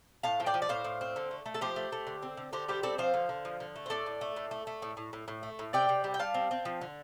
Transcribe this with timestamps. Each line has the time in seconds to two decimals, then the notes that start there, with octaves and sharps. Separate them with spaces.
0.23 A2 F5 A5
0.40 F3
0.46 D5 G5
0.54 F3
0.62 D5
0.69 A2 C5 F5
0.84 A2
1.01 C4
1.16 D3
1.31 A3
1.46 A3
1.54 A4
1.61 F3 G4 C5
1.76 A3
1.92 A3
2.07 D3
2.23 C4
2.37 D3
2.53 D3 G4 C5
2.68 G3 G4 C5
2.83 C4 A4 D5
2.98 F3 C5 F5
3.14 D3
3.29 D3
3.45 F3
3.60 D3
3.76 A3
3.86 C5
3.90 A2 A4 D5
4.06 A2
4.21 A3
4.36 A2
4.51 A3
4.67 A3
4.82 A2
4.97 A2
5.13 A2
5.28 A2
5.43 A3
5.59 A2
5.73 C3 D5 G5
5.89 C3
6.04 G3
6.14 G5
6.19 G3 F5 A5
6.34 C4
6.51 C4
6.65 F3
6.81 D3